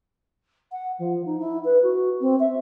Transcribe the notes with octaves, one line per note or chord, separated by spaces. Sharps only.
F#5
F3
D#4
E4
B4
F#4
C4
E5